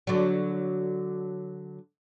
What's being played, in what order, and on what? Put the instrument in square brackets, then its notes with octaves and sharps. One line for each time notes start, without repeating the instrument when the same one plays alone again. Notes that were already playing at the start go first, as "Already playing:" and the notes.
[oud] D3 F#3